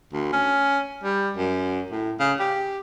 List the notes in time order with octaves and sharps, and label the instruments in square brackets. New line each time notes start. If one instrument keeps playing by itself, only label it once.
[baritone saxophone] D2
C#4
G3
F#2
A2
C#3
G4